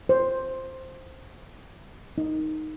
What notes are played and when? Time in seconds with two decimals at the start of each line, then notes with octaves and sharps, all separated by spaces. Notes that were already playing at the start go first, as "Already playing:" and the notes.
0.09 C5
2.18 D#4